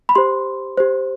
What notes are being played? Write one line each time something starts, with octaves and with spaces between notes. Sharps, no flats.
B5
G4 C5 C6
G4 C5